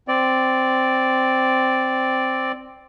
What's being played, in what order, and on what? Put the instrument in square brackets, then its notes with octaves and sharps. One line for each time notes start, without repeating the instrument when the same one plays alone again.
[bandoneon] C4 D5